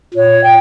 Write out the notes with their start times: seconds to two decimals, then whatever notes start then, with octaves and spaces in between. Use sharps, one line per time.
0.14 A#2 C#5
0.42 G5